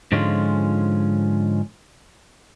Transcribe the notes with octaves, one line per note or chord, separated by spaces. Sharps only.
G#2 D3 F3 G#3 C#4 F4